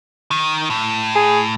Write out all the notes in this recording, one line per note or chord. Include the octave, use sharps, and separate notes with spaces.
D#3
A2
G#4